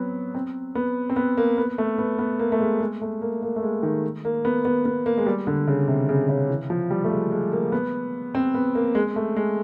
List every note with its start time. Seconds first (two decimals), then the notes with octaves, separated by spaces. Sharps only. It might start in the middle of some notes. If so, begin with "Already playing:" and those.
Already playing: F#3 B3 C4
0.35 C4
0.75 B3
1.10 C4
1.16 B3
1.37 A#3
1.58 B3
1.78 A3
1.98 B3
2.19 B3
2.39 A#3
2.52 A3
2.60 G#3
2.80 G#3
3.02 A3
3.21 A#3
3.42 A#3
3.56 A3
3.63 G#3
3.83 D#3
4.25 A#3
4.45 B3
4.65 B3
4.85 B3
5.06 A#3
5.18 G#3
5.27 G3
5.47 D3
5.68 C#3
5.88 C3
6.09 C#3
6.29 C#3
6.49 E3
6.70 F3
6.91 G3
7.04 A3
7.11 G#3
7.31 G#3
7.52 A#3
7.72 B3
8.35 C4
8.55 B3
8.75 A#3
8.95 G#3
9.16 A3
9.36 G#3